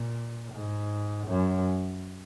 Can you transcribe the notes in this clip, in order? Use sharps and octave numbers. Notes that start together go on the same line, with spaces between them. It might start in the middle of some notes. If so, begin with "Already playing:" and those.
Already playing: A#2
G#2
F#2